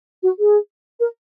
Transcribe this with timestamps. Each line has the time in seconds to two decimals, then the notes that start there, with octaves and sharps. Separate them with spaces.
0.23 F#4
0.38 G#4
0.99 A#4